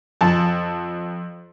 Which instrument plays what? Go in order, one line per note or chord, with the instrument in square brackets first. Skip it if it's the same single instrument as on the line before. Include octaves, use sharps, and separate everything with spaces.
[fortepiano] F2 A5